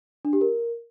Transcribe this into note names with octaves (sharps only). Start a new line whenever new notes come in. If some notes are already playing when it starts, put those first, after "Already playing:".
D4
G4
A#4